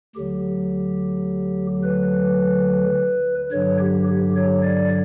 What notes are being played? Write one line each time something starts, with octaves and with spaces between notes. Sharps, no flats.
D2 D3 F#3 G4
B4
G2 D3 F#3 C#5
G4
G4
C#5
D5